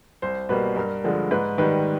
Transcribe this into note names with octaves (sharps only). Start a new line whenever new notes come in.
C2 C5
B2 G3 A#3 B4
G2 A#4
D3 F3 G#3
G#2 B4
D#3 G3 B4